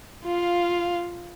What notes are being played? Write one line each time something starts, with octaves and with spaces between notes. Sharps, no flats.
F4 F5